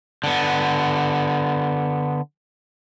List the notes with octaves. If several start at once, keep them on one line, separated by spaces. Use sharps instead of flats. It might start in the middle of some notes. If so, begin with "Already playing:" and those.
D3 B3